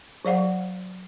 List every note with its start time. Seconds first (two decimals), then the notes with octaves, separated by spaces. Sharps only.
0.25 F#3 D5 F5 F#5